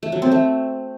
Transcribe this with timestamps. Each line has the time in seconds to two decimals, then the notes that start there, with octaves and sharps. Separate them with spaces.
0.03 A3
0.12 F#3
0.22 C4
0.32 A3